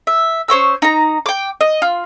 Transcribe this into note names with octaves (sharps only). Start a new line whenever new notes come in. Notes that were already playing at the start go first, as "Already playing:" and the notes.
E5
C#4 C5 C#6 E6
D#4 A#5
G5 D6
D#5
F4